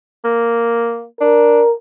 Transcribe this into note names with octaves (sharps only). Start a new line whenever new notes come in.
A#3
D4 A#4